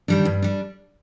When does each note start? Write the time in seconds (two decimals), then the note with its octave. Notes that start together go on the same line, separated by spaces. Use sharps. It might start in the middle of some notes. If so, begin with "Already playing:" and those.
0.08 D#3 G3 D4
0.25 G2
0.42 G3 D4